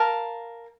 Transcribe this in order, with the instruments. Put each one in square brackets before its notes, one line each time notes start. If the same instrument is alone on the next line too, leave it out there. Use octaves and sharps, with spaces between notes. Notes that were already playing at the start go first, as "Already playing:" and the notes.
Already playing: [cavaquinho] A#4 F5 A5